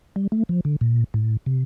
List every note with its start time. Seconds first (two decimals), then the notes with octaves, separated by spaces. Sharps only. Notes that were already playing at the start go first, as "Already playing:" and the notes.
0.16 G3
0.32 A3
0.49 F3
0.65 D3
0.81 A#2
1.14 A2
1.46 C3